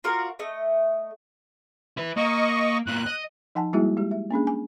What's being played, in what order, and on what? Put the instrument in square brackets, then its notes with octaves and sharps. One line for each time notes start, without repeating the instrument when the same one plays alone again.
[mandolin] F4 F#4 A#4 D5
A3 D#5
[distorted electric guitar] E4 B4
[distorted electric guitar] A#3 [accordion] D#5 C#6
[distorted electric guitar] A2 A#3 [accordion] F#6
[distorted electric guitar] D#5
[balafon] F3 D#4 F#5 G#5 A5
G3 G#3 A#3 E4 F#4 G#4
G#3 G4
E5
A#3 C#4 D4 G#4
G#5